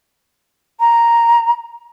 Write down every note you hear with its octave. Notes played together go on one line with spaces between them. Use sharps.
A#5